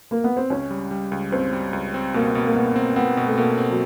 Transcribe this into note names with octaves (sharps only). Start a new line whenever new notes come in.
A#3
B3
C4
C#2 C#4
G3
G3
C#2
C#2 C4
G3
C#2
C4
B2 A#3
B2
A#3
B2 B3
C4
B3 C4
B2
A3
B2 A#3
C4
F#3